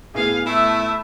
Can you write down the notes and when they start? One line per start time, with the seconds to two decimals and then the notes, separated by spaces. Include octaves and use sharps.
0.15 A2 B3 G#4 F5
0.46 A3 E4 E5